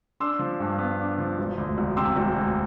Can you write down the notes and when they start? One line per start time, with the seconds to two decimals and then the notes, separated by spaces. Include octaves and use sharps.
0.20 D4 C6 E6
0.39 F3
0.60 G2
0.79 B3
0.99 D4
1.18 F3
1.39 E1
1.58 D2
1.78 E1
1.97 C3 C6 E6
2.16 E1
2.36 D2